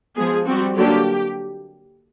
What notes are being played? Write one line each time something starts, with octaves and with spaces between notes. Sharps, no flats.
F3 G#3 B3 G#4
G3 C4 F#4
D3 F#3 A#3 D4 G4